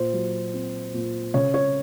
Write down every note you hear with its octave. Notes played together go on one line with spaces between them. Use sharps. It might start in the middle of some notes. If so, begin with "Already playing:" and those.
Already playing: A#2 C5
F#3
C4
A#2
C#3 C#5
C#5